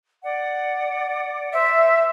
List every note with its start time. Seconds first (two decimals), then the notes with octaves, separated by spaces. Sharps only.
0.23 D5 F#5
1.53 C5 E5